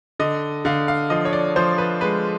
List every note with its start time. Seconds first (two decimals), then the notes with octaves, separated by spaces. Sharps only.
0.19 D3 D#5
0.65 D3 F5
0.88 F5
1.10 F3 D#5
1.25 C#5
1.33 D5
1.56 F3 C5
1.78 B4
2.01 G#3 B4